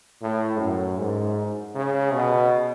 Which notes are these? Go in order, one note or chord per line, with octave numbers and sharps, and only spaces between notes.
A2
F#2
G#2
C#3
B2